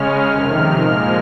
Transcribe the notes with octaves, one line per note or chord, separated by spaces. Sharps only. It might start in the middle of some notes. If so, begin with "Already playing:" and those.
Already playing: C#3 G#3 C#4 F6
F2 C3 D#3
A#2 F3 G#3 F6